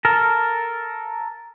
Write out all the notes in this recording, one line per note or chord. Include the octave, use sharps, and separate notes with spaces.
A4 A#4